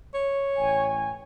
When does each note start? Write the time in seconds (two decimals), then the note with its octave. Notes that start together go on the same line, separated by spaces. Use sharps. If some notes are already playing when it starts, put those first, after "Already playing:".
0.14 C#5
0.58 A1 G5 G#5